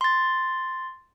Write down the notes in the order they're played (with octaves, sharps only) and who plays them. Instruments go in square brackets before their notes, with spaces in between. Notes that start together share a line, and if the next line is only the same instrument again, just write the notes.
[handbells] C6 A6